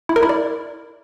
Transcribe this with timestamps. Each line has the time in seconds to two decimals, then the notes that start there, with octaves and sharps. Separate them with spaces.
0.09 E4
0.16 A#4
0.23 E4
0.29 D5